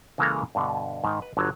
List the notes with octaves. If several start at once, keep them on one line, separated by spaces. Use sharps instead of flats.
C#3 E3 G#3 A#3 A4 A#5
G2 B2 D3
G#2 D#3
B4
G1 D3 F#3